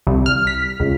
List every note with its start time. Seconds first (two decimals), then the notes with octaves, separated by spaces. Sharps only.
0.07 C2
0.26 F6
0.47 B6
0.80 C#2